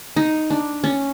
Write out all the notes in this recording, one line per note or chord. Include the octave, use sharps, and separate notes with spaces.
D#4
D4
C#4